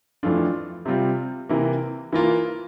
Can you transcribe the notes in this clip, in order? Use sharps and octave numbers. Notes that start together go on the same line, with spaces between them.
F2 E3 A3 D4 F4
C3 G3 C4 F4
C3 E3 A#3
E3 A#3 F4